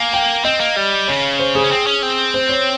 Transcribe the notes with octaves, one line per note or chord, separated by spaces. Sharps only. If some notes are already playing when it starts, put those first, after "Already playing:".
Already playing: A#3 G#5
G5
C4 D#5
A#3
G3
C#3 C#5
C5
G#4
C#4
C4
C#4
C4
C5
C#5